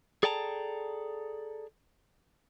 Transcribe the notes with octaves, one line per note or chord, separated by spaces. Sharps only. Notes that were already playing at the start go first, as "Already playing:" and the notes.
G#4 A4 D5 G5 A5 A#5